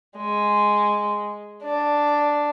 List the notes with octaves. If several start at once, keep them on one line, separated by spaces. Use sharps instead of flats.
G#3
D4